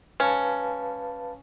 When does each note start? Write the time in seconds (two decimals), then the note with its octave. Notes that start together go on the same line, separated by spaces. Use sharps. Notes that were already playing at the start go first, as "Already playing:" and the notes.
0.20 C#4 B4 F5 A5